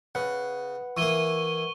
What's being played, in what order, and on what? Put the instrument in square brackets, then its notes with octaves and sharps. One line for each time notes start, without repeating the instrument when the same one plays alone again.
[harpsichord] C#3 [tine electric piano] B4 F#5
[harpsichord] E3 A#3 [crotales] C#6 D#7 G7